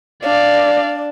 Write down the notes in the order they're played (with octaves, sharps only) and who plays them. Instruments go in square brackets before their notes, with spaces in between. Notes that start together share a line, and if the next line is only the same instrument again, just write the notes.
[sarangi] D4 [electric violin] D5 F5